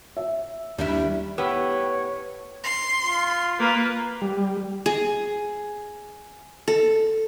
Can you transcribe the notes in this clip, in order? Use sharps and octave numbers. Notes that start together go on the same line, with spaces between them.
E5
D#2 D#3 G3 D4 E4
A2 B3 G4 C#5
C6
F4
A#3 B4
G3
G#4
A4